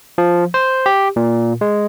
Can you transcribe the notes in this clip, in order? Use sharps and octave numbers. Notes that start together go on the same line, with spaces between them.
F3
C5
G4
A#2
G#3